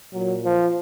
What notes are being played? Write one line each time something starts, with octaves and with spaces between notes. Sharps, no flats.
A#2 F#3
F3